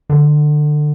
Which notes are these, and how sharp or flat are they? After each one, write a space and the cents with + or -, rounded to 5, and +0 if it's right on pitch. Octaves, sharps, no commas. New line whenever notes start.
D3 +25